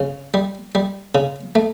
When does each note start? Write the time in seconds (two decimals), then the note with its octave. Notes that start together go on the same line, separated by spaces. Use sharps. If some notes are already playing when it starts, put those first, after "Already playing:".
Already playing: C#3 C#4
0.34 G3
0.75 G3
1.15 C#3
1.55 A3